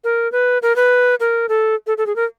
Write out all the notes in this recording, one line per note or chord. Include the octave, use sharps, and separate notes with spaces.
A#4
B4
A#4
B4
A#4
A4
A4
A4
G#4
A#4